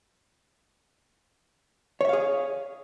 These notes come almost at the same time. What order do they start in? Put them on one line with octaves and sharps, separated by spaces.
C#5 E5 F5 G#4